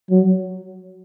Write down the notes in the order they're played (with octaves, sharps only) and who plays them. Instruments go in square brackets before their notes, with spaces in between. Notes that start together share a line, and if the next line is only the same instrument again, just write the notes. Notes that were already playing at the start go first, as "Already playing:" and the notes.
[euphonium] F#3